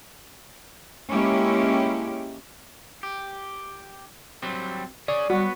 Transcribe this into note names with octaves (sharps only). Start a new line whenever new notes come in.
G#3 A#3 C#4 E4 G4
G4
F#3 G3 C4
G#4 C#5 D5
G3 B3 F#4